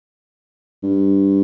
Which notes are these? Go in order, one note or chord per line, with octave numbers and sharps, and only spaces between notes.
G2